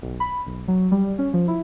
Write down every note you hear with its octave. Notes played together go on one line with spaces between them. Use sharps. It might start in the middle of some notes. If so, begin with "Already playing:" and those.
B1
B5
B1
F#3
G3
C#4
F3
E4